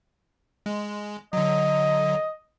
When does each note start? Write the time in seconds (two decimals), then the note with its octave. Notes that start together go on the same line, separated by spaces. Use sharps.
0.66 G#3
1.33 D3 F#3 D#5